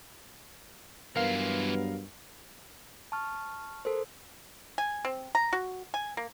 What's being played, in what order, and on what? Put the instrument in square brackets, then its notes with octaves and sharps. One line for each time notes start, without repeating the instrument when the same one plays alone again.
[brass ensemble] G2 F#3 B3 [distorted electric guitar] E3 F4 [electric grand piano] A#4 F5
[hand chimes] A5 C#6 F6
A4 A#4 C5
[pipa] G#5
C4
A#5
F#4
G#5
A#3